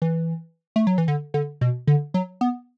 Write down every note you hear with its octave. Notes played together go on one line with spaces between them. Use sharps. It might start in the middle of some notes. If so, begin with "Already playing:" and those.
E3
A3
F#3
E3
D3
D3
B2
D3
F#3
B3